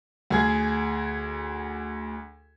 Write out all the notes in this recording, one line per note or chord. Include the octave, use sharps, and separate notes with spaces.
D2 G#4 G#6